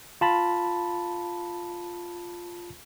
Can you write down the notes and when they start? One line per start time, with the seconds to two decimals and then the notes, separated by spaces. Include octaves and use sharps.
0.21 F4 A5 B5